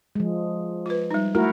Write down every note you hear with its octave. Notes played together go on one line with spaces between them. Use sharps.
F3 G#3
F4 B4
G3 D#4
A3 E4 F#4 A#4